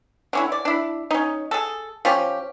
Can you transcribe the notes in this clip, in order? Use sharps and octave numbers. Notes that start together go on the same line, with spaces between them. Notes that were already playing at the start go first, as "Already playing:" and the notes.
D3 C#4 E4
D5
D4 E4
C#4 D#4
G#4 A4
F3 C#4 G4